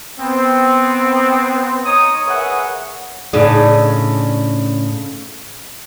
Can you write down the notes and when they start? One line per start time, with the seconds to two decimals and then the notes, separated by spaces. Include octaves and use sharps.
0.20 B3 C4
1.85 D#4 C#5 A#5 D#6
2.26 G#4 A#4 B4 C#5 E5 F#5
3.33 A2 C#3 D4 D#4 G#4